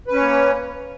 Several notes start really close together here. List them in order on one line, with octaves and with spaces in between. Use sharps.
B4 C#4 C#5 A#3